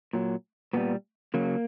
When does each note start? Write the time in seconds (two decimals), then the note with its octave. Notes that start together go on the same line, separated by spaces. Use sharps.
0.13 A#2 F#3
0.73 A#2 G3 B3
1.34 C#3 F#3 A#3